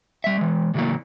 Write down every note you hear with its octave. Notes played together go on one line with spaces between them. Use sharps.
G3 E5
E3 G#3
A2 C#3 E3 F#3 A3 A#3